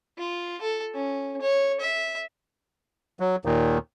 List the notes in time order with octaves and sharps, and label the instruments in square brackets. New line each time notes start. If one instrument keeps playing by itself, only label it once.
[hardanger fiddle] F4
A4
C#4
C#5
E5
[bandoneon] F#3
D#2 A#2 D#3